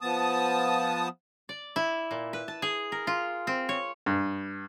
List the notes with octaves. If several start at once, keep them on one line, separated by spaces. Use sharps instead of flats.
F3 B3 A5 D#6
D5
E4
A#2
B4
A5
G#4
A#4
F4
C4
C#5
G2